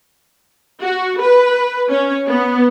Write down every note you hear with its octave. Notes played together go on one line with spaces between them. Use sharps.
F#4
B4
C#4
B3